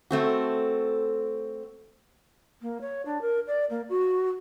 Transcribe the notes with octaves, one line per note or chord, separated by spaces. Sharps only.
A3 C4 F#4
A#3
C#5
D4
A#4
D5
A#3
F#4